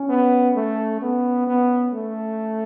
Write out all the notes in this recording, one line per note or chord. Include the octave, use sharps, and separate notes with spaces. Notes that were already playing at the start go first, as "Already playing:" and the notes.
Already playing: C#4
B3
A3
B3
B3
A3